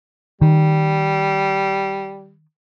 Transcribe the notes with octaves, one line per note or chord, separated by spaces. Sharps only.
D#3 G3